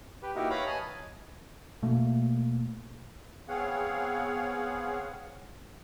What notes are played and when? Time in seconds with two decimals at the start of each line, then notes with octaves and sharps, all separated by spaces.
0.22 G4 B4
0.35 A#3 D#4 E4 F#4 G4 A#4
0.50 B4 C#5 F5 A#5 B5
0.66 D#5 G#5 A5
1.82 B2 A3 A#3
3.48 B3 C4 G#4 C#5 F5 F#5